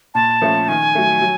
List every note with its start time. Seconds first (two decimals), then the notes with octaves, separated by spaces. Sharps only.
0.14 A#2 A5
0.41 F3 A3 C#4
0.68 D#3 G#5
0.95 F#3 A3
1.21 F#3